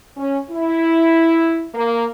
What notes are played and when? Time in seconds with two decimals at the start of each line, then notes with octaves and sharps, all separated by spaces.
0.17 C#4
0.51 E4
1.75 A#3